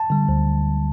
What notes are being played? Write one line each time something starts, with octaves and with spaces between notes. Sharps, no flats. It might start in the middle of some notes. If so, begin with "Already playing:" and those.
Already playing: A5
D3 G3
D2